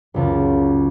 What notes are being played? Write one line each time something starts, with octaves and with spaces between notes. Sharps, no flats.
F#1 C#2 A5